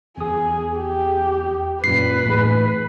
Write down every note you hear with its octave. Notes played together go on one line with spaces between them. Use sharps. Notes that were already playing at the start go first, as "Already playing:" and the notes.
E2 G#4 D#6
G4
F#2 A#2 B4 C7
A2 E3 D#4 G#4